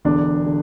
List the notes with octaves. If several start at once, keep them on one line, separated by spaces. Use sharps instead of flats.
E1 E2 D3 D4
D3